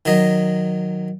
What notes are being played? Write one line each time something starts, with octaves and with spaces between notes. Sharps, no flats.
D#3 F#3 D#5